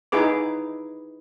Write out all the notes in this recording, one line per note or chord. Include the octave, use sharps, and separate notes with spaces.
D#4 E4 G#4 B4 D6